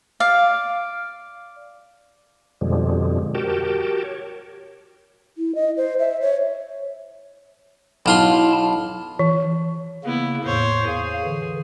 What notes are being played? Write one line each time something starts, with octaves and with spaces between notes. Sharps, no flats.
D5 F5
F2 B2 D3 F3 G3 G#3
F#4 G4 A#4 G5 A5
C#5
E4
D#5
C5
E5
C#5
B1 E4 F4 A5 C6
E3
C#3 A#3 B3 E4
E2 A2 C5 C#5
G#4 F5
D3 E3